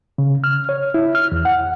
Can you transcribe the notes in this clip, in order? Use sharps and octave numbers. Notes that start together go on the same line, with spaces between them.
C#3
F6
C#5
E4
F6
E2
F#5